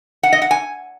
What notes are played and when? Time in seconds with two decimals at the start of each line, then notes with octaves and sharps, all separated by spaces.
0.23 F#5
0.32 D#5
0.42 F#5
0.51 G#5